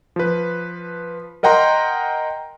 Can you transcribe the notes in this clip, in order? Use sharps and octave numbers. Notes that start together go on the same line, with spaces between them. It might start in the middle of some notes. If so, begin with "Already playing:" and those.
F3 B4
A#4 D#5 F#5 G5 A#5 C6